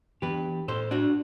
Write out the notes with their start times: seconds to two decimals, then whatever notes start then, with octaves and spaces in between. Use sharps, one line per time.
0.22 E3 B3 D4 G4 B4
0.68 A2 A4 C5
0.91 D4 F#4